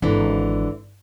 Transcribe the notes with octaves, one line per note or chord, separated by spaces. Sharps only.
G#1 D3 E3